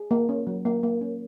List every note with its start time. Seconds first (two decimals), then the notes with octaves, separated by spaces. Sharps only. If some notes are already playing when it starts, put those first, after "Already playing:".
Already playing: G#4
0.11 A#3
0.29 C#4
0.47 F#3
0.65 A#3
0.83 A#3
1.01 C#4